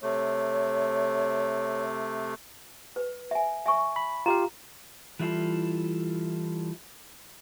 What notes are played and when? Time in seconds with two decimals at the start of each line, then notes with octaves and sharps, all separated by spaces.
0.02 C3 A3 C#5
2.96 B4
3.31 E5 G#5
3.66 E5 G#5 C#6
3.96 B5
4.26 F4 G4 F5 A#5
5.19 E3 G3 E4 F4 A4